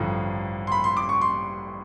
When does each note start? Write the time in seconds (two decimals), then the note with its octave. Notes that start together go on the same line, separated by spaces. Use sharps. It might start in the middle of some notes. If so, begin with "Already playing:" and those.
Already playing: A1 G2 D3 F3
0.67 C6
0.72 B5
0.84 C6
0.97 D6
1.09 C#6
1.22 C6